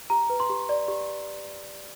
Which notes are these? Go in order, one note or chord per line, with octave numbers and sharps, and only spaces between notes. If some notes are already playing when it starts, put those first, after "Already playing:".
G4 A#5
B4
C6
G4
D5
G4